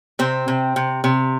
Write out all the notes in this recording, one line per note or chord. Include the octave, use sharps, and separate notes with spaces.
C3 C4
C3
C3
C3